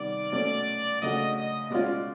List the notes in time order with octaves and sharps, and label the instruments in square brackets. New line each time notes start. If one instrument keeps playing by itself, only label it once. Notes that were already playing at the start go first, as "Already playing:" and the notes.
Already playing: [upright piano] C3 D#3 G3 B3 [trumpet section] D5
[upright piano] B2 F#3 A3 C#4 [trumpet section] D5
[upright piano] C#3 F#3 A3 D4 F#4 [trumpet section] D#5
[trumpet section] D#5
[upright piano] B2 G#3 C#4 F4 [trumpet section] D5